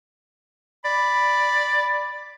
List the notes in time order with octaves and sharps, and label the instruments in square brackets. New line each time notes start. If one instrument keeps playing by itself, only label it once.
[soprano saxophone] D5 [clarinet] B5